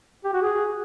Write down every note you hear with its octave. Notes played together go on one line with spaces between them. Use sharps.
G4
F#4
G#4